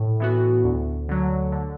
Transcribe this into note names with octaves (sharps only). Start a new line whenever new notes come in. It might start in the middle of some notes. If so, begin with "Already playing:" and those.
Already playing: A2
E3 B3 F#4
D2
D3 F#3
D3